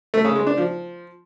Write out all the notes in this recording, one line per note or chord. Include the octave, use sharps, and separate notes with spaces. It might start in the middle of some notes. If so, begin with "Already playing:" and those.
A3
C#3
G#3
D4
F3